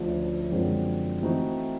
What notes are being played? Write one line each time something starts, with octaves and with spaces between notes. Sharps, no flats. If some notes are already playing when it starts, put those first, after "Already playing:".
Already playing: D2 D3 F3 A3 C#4
F#2 D3 F3 G#3 C4
E3 A3 C4 D#4 F#4